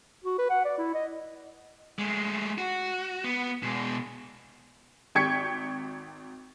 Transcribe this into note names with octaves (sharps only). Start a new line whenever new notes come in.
F#4
B4
F#5
D5
E4
D#5
G#3 A3
F#4
B3
B2 G#3
G#1 G5 C#6 G#6 B6 C#7